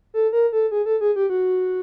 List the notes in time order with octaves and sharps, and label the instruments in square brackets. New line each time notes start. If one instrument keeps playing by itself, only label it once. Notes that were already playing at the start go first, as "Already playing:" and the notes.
[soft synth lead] A4
A#4
A4
G#4
A4
G#4
G4
F#4